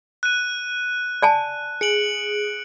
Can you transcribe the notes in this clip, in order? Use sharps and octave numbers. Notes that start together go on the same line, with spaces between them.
F#6 D#7
D5 G#5 A5
G#4 C#7 D7 F#7